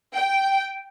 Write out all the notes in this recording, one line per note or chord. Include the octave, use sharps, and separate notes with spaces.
G5